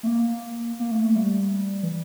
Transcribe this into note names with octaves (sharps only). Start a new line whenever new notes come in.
A3
A#3
A#3
A3
A3
G3
E3